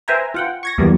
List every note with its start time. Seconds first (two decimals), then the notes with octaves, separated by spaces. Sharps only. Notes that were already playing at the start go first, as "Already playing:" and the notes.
0.08 B4 C5 E5 G5 G#5 A#5
0.34 F4 F#5 G5
0.63 C#6 G#6 A#6
0.78 E2 E3 F#3 G3 A#3 B3